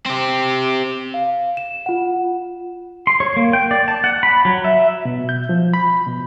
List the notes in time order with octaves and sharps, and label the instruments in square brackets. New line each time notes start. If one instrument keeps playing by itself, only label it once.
[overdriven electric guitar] C4 G4
[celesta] F5
E7
F4 F#5
[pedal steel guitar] C6
C#5
A#3
G5
D5
A5
F#5
B5
F#3
E5
[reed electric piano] B2
G6
F3
B5
B2